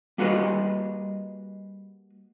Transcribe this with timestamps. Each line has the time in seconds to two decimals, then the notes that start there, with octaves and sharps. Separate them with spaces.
0.18 G3 A#3 F#4 G#4 B4 D#5